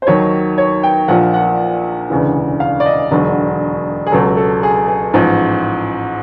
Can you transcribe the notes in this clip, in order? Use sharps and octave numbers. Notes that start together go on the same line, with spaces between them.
C5
D#2 D#3 F#3 C#5
C#5
G5
A#1 A#2 F3 F#5
F#5
E1 D2 C#3 E3
F5
D5
D#5
E1 D#2 D3 F#3
G#4
C#2 B2 F#3 A4
A4
G#4
G#4
A1 G#2 F3